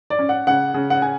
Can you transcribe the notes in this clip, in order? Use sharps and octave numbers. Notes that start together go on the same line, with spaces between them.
D5
C#4
F#5
C#3 F#5
C#3
F#5
G#5